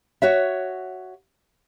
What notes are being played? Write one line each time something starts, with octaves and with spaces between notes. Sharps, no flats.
F#4 C#5 E5